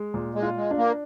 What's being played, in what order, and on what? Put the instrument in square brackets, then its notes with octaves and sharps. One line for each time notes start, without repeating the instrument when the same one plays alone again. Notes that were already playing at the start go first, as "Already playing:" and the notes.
Already playing: [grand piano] G#3
A#2
[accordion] G#3
[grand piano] F4
[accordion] G#3
[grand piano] D4
[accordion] A#3